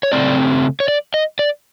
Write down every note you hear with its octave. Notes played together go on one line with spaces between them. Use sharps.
C#5
C#3 E3 A3 C4 D5
C#5
D5
D#5
D5